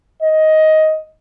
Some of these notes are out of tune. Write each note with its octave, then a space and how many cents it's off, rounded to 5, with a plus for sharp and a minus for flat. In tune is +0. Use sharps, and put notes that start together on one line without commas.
D#5 +10